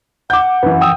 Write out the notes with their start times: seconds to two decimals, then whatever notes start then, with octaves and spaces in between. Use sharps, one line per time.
0.30 F#5 D6 G6
0.63 F#2 E3 B4
0.81 F3 G5 D#6 E6